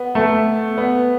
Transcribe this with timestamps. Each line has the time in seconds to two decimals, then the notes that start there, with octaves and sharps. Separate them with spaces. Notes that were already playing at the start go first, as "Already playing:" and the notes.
Already playing: B3
0.15 A3
0.77 B3